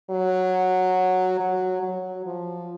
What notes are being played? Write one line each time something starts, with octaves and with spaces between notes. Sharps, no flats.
F#3
F#3
F#3
F3